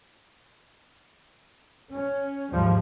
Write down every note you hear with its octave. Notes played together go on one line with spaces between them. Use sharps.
C#4
D#2 G#2 F3 G3